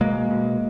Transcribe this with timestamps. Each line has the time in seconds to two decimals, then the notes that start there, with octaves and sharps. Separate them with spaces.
0.01 B2 G#3 A#3
0.30 B2